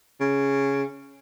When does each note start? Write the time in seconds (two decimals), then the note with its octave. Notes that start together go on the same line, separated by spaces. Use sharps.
0.21 C#3